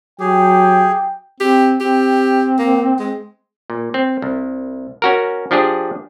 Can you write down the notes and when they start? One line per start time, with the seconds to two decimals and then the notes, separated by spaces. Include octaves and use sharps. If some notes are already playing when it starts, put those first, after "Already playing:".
0.20 F#3 G4 G#4 G5
1.40 C4 G4
1.80 C4 G4
2.58 A#3
2.99 G#3
3.70 A#2
3.94 C4
4.22 C2
5.02 C#4 F#4 A#4
5.51 F3 D4 G4 G#4